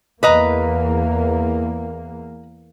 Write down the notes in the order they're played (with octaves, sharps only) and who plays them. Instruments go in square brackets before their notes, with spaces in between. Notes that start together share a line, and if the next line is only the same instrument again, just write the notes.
[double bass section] E2 A#3 [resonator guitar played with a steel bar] B4 D#5 A#5